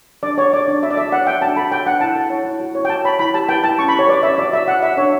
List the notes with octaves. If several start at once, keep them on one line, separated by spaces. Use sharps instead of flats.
D4 D5
A4 C#5
C#5 D5
D4
F#4 E5
D5
A4 E5
C#5 F#5
F#4 G5
D4 A5
A4 B5
C#5 G5
D4 F#5
E4 A5
A4
C#5
E4
F#4
C#5
G5
F#4 A5
C#5 B5
E4 B5
G4 A5
B4 G5
E4 A5
C#4 C#6
B5
G4
C#5
B4 D5
C#4 E5
F#4 D5
C#5 E5
F#4 F#5
C#5 E5
D4 C#5